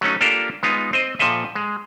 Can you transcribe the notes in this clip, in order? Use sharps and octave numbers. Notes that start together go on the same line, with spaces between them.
F#3 A3 C#4 D#4
A#3 D4 F4 G4 A4 A#4
G#3 B3 D#4 F4
C4 C5 D#5
A#2 F3 A4 D#5 E5
G#3